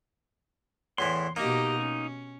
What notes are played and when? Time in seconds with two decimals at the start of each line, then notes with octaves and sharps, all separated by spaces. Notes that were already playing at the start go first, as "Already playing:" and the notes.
0.98 E2 A2 E3 C6
1.36 B2 A#3 D#4 G4 D#5
1.79 C#4